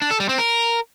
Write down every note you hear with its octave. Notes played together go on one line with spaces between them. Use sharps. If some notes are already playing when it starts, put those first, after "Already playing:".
D4
A4
G3
C4
A#4